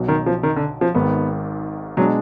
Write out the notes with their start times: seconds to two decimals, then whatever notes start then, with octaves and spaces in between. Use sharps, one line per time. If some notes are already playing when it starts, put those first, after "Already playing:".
Already playing: B1 B2 F#3
0.08 D#3
0.26 F3
0.43 D#3
0.56 D3
0.81 F3
0.95 G#1 G#2 D#3 B3
1.97 B2 F#3 G#3 D4